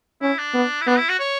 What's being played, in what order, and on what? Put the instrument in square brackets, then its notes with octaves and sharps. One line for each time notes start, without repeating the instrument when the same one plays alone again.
[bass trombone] C#4 [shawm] E4
[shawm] D4
[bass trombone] B3
[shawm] E4
[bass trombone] B3 [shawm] D4
[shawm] E4
F#4
C#5